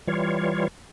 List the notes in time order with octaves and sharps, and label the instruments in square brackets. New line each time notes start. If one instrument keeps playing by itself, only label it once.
[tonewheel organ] E3 G3 F4 C#5